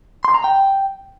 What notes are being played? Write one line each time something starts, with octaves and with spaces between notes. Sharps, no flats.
C6
A#5
G5